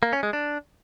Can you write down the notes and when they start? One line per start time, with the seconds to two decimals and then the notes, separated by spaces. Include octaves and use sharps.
0.03 A#3
0.13 C#4
0.23 G#3
0.33 D4